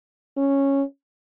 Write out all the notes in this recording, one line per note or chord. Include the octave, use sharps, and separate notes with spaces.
C#4